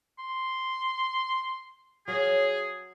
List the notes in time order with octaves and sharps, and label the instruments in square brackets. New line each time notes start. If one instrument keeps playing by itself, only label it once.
[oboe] C6
[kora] F#3 F5 [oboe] G#4